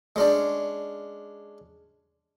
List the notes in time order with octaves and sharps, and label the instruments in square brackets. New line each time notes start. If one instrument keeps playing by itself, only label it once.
[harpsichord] G#3 C#4 D4